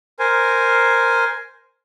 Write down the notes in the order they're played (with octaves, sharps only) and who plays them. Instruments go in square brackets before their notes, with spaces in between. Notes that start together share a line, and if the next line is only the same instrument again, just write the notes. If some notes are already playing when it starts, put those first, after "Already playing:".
[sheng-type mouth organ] A#4 C5 G#5